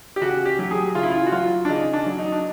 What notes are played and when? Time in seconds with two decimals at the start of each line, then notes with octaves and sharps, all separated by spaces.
0.16 G4
0.21 C#3 F#4
0.46 G4
0.59 F#3 G4
0.71 G#4
0.95 C#3 F4
1.03 E4
1.11 F4
1.27 F#4
1.32 F#3 F4
1.65 D4
1.69 C#3 D#4
1.93 D4
2.06 F#3
2.18 D#4
2.32 D4